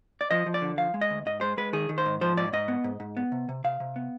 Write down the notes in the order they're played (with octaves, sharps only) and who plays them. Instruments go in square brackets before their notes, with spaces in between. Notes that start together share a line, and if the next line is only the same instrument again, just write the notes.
[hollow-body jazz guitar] D5
F3 D#5
F3
D5
D3
F3 F5
G#3
D#5
D2
G#2 D#5
G#3 C5
G#3 B4
D#3 G#4
D#3
C5
G#2
F3 C5
G#2 D5
G#2 D#5
B3
G#2
G#2
B3
C3
C3
C3 F5
C3
B3